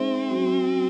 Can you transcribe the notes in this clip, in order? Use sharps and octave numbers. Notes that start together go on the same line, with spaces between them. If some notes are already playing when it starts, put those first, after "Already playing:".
Already playing: G#3 C4 D#4 G#4 C5 E5
F#3 C#4 F#4